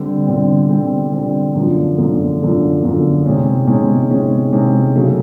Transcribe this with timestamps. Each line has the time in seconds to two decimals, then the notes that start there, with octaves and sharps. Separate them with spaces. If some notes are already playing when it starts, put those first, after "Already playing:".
Already playing: D3 G3 C4
0.26 D3 G3 C4
0.69 D3 G3 C4
1.12 D3 G3 C4
1.55 F#2 D3 F3 A3
1.97 F#2 D3 F3 A3
2.40 F#2 D3 F3 A3
2.82 F#2 D3 F3 A3
3.25 C3 D#3 G#3 C#4
3.67 C3 D#3 G#3 C#4
4.10 C3 D#3 G#3 C#4
4.52 C3 D#3 G#3 C#4
4.95 C#3 F#3 A3